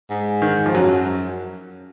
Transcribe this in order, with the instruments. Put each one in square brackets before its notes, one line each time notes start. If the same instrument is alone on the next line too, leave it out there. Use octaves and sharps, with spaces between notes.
[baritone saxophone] G#2
[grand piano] D#3
F3
[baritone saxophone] F#2 [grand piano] F#3